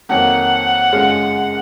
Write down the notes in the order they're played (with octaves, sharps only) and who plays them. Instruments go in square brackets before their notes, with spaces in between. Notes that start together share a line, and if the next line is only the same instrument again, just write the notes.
[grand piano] F2 D#3 F#3 A#3 [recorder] F#5
[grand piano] F#2 C#3 G#3 C#4 F4